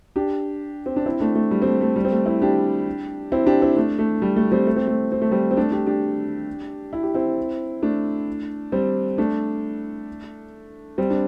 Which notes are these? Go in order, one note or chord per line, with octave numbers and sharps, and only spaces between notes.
D4 G4
C4
D4
C4 E4
A3 D4
A3
G3
C4
A3
A3
G3
C4
A3
C4 E4
D4 G4
C4 E4
D4 G4
C4 E4
A3 D4
A3
G3
A3
G3 C4
A3
C4
A3
C4
A3
G3 C4
C4
A3 D4
D4 G4
D4 G4
E4
G4
C4 E4
A3 D4
G3 C4
A3 D4
G3 C4
D4